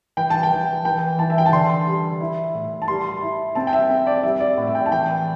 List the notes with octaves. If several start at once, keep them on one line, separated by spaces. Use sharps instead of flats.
E3 G5
A5
G5
E3
E3 G5
E3 A5
E5
G5
A5
D3 C6
G3
E4
A2
A5
G3 C6
E4
C4 A5
G5
E5
C4
D5
G3 E5
D5
A2
E5
G5
A5
E3 G5